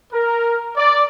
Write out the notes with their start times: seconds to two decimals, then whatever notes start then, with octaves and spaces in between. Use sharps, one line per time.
0.13 A#4
0.77 D5